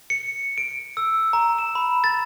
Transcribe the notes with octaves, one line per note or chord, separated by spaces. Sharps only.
C#7
D7
E6
A#5
E7
B5
A6